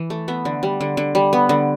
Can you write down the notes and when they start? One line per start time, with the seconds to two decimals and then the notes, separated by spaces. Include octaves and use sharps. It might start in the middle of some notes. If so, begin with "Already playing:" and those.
Already playing: E3
0.10 A3
0.28 B3 E5
0.45 D3
0.63 G3
0.81 D3
0.97 D3
1.15 G3
1.33 B3
1.49 D3